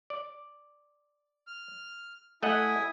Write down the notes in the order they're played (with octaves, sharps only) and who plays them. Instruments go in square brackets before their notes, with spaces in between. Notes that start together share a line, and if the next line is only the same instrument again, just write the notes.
[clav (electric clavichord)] D5
[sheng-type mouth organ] F6
[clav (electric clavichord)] A3 D#5 F#5 [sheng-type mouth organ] E4 G#5 D#6